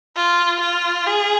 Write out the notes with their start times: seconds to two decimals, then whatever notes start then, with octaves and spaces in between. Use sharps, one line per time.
0.16 F4
0.61 F4
1.07 G#4